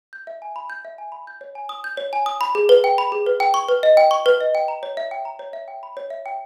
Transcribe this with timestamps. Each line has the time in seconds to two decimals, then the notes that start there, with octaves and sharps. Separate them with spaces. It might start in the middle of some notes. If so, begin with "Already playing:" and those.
0.13 G6
0.27 E5
0.42 G#5
0.56 B5
0.70 G6
0.85 E5
0.98 G#5
1.12 B5
1.27 G6
1.41 C#5
1.55 G#5
1.69 D#6
1.84 G6
1.97 C#5
2.13 G#5
2.26 D#6
2.41 B5
2.55 G#4
2.69 B4
2.84 G5
2.98 B5
3.12 G#4
3.26 B4
3.40 G5
3.54 C#6
3.69 B4
3.83 D#5
3.97 G5
4.11 C#6
4.26 B4
4.41 D#5
4.55 G5
4.68 A#5
4.83 C#5
4.97 E5
5.11 G5
5.25 A#5
5.39 C#5
5.53 E5
5.68 G5
5.83 B5
5.97 C#5
6.10 E5
6.26 G5